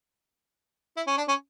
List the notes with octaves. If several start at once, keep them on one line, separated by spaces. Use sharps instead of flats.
E4
C#4
D4
C#4